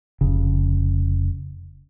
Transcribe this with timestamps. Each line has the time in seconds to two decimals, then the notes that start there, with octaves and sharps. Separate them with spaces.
0.21 F1 C#3